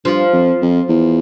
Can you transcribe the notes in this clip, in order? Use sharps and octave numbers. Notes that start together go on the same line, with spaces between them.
G2 F3
F2
F2
E2